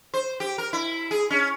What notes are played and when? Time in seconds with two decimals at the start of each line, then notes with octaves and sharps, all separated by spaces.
0.14 C5
0.40 G4
0.58 A#4
0.73 E4
1.11 G#4
1.30 C#4